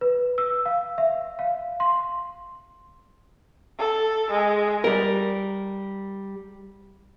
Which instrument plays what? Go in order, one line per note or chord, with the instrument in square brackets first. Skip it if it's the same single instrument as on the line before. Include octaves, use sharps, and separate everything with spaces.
[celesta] B4
E6
F5
E5
F5
C6
[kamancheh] A4
G#3
[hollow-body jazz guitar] G3 A#4